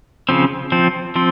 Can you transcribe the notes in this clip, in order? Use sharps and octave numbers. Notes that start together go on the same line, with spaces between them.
C#3 F3 C4
F3 C4
F3 C4